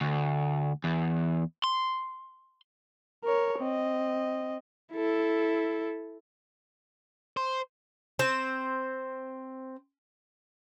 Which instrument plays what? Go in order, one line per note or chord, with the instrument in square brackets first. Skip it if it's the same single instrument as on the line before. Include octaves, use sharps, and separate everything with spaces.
[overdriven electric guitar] D2
E2
C6
[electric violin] A#4 C#5
C4 D#5
E4 A4
[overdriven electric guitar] C5
[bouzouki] C4 C5